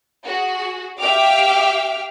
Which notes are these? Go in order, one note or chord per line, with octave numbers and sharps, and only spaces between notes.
F#4 G#4
G4 E5 F5 G5 D6 F6